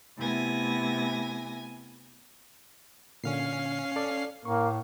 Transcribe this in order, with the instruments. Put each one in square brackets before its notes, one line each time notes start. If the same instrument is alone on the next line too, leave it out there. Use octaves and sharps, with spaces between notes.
[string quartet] C3 A3 B3 E4 G#5 A#6
[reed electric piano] A#2 D3 [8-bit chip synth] C#4 F5 C7
[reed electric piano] A4 D5
[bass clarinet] A2 [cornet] A#3 [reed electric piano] C#6